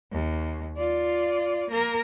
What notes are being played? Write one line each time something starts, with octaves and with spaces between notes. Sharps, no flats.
D#2
F4 D5
A#3 A#4